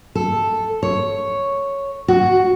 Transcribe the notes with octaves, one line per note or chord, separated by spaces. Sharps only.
A4
C#5
F#4